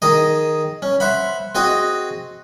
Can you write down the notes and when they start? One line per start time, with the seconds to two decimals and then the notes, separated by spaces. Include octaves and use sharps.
0.02 D#3 G#4 D#5
0.82 C#4
1.00 C5 E5 F#5 B5
1.55 C4 F#4 G#4 D#5